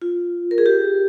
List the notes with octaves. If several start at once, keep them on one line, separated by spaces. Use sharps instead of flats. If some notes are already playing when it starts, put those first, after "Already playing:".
F4
A#4
G#4
G4